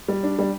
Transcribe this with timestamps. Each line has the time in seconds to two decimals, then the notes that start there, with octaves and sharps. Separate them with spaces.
0.08 G3
0.23 D4
0.39 G3